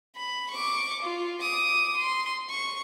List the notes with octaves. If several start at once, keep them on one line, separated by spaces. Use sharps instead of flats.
B5
C#6 D6
F4
D6 D#6
C6
C#6